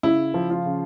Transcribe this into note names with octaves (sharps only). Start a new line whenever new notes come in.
C#3 E4
F3
F4
C#3